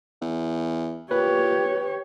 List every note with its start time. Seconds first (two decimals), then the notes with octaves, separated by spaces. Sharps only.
0.22 E2
1.11 A#2 G4 B4 C#5